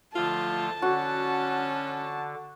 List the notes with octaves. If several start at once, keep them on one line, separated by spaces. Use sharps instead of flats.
D3 F3 A3 F4 A5
D3 C#4 F#4